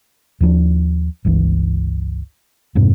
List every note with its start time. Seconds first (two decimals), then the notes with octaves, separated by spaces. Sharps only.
0.40 D#2 F3 G3 D4
1.25 G1 C#2 E3
2.75 F2 G#2 C3